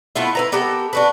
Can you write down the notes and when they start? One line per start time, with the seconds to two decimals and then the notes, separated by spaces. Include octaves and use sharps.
0.16 A3 B3 E4 F4
0.35 E4 B4 A#5
0.52 B3 G4 A4 A#4
0.93 D4 F#4 B4